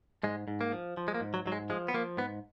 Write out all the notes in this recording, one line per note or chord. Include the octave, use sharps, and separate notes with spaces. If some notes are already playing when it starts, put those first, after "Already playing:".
G#2 G#3
G#2
A#3
F3
F3
G#3
A#3
G#2
F#3
G#2 F#3
G#3
F3 G#3
B3
F3 A#3
G#2 B3